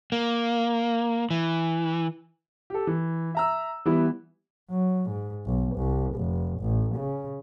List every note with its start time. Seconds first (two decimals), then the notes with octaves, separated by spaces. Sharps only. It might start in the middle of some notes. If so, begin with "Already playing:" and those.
0.12 A#3
1.30 E3
2.70 G4 A4
2.87 E3
3.34 E5 A#5 E6
3.85 E3 G3 B3 E4
4.70 F#3
5.10 G#2
5.46 B1
5.76 C2
6.16 F1
6.61 A1
6.96 C#3